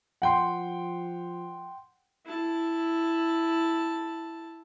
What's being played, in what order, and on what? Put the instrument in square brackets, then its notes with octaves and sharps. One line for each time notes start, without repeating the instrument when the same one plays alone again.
[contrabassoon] F3 [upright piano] F#5 G5 C6
[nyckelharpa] E4 A5